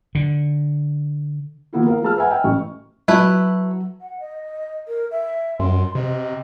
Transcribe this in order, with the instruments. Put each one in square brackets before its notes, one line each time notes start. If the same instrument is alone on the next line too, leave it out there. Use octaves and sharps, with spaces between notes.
[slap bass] D3
[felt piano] D#3 F3 A#3 B3 E4 F4
A#4 F5
F3 A3 G#4 A5 E6 F6
B4 E5 F#5 G#5
D#5 E5 G5 G#5
A1 A3 C#6
[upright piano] F#3 [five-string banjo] A3 E4 B4
[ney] F#5
D#5
A#4
E5
[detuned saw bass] F#2 [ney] C6
[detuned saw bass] C3 [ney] D#5